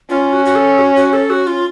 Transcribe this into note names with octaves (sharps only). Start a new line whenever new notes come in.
C#4 F4
F#4
F#4
A4
F#4
F#4
A4
F#4
F4